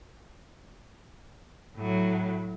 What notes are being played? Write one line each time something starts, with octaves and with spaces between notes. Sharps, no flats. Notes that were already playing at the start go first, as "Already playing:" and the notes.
A2 F#3